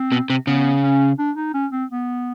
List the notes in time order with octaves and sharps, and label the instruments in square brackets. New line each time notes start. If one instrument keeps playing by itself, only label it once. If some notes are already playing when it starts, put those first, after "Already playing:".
Already playing: [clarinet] C4
[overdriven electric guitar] B2
C3
[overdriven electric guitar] C#3 [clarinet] B3
[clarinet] C#4
D4
D#4
C#4
C4
B3